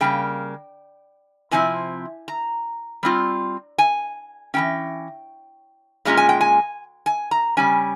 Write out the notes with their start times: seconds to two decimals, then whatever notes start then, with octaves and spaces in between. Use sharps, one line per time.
0.01 C#3 G3 A#3 G5
1.51 C3 F3 C4 E4 G#5
2.28 A#5
3.03 G3 C4 F4
3.78 G#5
4.54 E3 G3 C#4 G5
6.05 A#2 G#3 C#4 F4 A#5
6.17 G#5
6.29 G5
6.41 G#5
7.06 G#5
7.31 A#5
7.57 C#3 G3 C#4 G#5